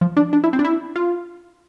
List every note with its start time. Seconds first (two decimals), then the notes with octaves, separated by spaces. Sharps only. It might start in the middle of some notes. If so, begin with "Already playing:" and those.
0.01 F3
0.17 D4
0.33 D4
0.44 E4
0.53 C4
0.59 D4
0.64 E4
0.96 F4